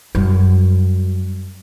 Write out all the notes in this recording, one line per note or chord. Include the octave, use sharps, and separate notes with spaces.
F#2 G3